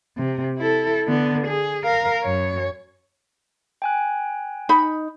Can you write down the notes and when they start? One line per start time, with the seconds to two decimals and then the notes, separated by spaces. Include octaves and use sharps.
0.17 C3
0.58 E4 A4
1.07 D3 B3
1.47 G#4
1.84 A#4 F5
2.23 F#2 C#5
3.82 G5 G#5 F#6
4.69 D#4 B5